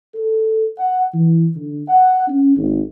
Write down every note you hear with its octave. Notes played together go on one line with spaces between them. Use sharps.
A4
F#5
E3
D3
F#5
C#4
G#1